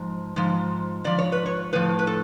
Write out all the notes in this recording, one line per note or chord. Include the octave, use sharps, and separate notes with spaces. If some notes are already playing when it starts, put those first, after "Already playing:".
Already playing: G#2 F3
G#2 F3
G#2 F3 D5
C#5
B4
C#5
A2 F3 B4
B4
A4